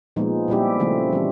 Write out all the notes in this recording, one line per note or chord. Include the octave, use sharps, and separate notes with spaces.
A#2 F3 G#3 B3 D#4
A#2 G3 C4 E4 G4
C#3 F3 A3 C4
E3 G3 C4